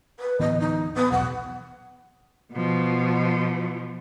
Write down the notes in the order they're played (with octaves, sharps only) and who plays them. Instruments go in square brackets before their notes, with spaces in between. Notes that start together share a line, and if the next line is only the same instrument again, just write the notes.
[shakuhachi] B4
[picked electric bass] D1 E3 B3 [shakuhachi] D#5
[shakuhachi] D#4
B3
[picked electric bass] E1 B1 [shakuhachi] F#5
[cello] B2 F3